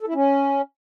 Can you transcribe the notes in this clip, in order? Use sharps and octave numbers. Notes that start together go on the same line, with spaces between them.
A4
E4
C#4